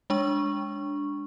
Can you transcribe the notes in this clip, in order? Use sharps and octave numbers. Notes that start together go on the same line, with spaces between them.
G#3 D4 C#6